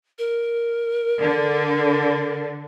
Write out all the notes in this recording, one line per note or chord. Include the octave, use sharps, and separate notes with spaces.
A#4
D3